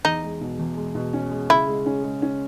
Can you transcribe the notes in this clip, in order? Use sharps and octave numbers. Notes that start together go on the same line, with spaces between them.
E2 D#4
G#3
B2
E2
G#3
B2
C#4
G#3
C#3 E4
G#3
C#4
G#3
C#4